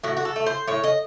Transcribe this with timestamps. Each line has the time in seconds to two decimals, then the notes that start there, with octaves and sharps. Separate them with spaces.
0.04 A2 F#4
0.17 F#4
0.25 A4
0.36 A3
0.46 C5
0.67 A2 C#5
0.84 D#5